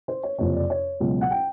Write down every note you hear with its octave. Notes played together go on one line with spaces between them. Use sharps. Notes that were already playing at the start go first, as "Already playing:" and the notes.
C5
C#5
F#1 F2 C3 C#5
D5
C#5
C#2 B2 F#3
F#5
G5